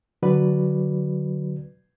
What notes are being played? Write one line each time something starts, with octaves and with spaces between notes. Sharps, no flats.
D3 F#3 F#4 B4 D5